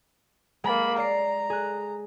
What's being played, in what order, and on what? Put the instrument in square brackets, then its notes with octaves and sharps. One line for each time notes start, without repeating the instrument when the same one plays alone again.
[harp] G#3 A6 [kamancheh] A#3 B5
[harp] D5 C7 [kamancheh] A#5
[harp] G#4 F#6